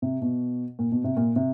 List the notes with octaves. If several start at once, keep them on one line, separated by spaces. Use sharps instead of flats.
C3
B2
A#2
B2
C3
A#2
C3